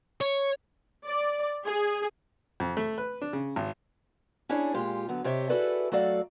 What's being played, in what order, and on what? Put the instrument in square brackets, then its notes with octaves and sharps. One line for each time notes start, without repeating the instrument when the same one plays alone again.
[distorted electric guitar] C#5
[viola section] D5
G#4
[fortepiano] F2
A3
B4
D4
C#3
G#1
[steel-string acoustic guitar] C#4 D4 E4 G#4 C#5 D5
A#2 G#3 F4 G4
D3 F#3 B3
C3 G4 C#5 D#5 E5
E4 F#4 G#4 A4 B4 D5
F#3 A3 F#4 A4 D5 F5